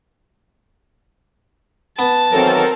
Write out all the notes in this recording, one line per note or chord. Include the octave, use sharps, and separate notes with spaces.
B3 A5
D#3 E3 F#3 C4 A4 A#4